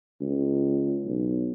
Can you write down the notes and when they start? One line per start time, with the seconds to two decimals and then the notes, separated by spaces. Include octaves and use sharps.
0.21 C#2
1.05 B1